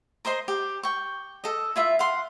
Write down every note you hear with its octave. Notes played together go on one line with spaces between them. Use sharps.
A#4 C5 D#5 C6
G4
G5 C#6
A4 D#5
E4 F4 E5
F5 F#5 C6